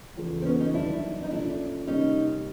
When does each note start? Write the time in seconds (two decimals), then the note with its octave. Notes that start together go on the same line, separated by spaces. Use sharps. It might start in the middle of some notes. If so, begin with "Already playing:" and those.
0.17 E2 C#3 F3 A3
0.42 C4
0.45 B3 C#4
0.60 C#4 D#4
0.74 G2 D#3 F#3 D4 E4
1.14 D4
1.23 D#4
1.31 A#2 F3 A3 C#4 D4 E4
1.87 C3 D#3 G3 A#3 C#4 D#4